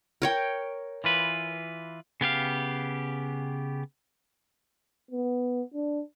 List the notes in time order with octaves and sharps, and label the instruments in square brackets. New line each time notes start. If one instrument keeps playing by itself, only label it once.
[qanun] A#4 C#5 G5
[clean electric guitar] E3 F4 B4
[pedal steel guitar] C#3 B3 G4 F5
[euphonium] B3
D4